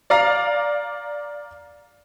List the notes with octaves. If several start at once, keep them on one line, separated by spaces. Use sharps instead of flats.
D5 F5 A#5